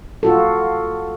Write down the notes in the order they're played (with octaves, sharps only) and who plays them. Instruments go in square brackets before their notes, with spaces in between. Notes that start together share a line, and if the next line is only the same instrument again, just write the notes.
[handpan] F4 F#4 A4